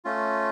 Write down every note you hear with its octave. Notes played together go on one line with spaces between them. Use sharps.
A3 C#4 F4